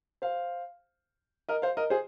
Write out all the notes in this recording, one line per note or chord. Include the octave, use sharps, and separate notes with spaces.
C5 F5
A#4 D#5
C5 F5
A#4 D#5
G#4 C5